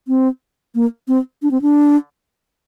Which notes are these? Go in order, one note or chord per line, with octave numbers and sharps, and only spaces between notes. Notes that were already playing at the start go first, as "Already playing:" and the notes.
C4
A#3
C4
D4
C4
D4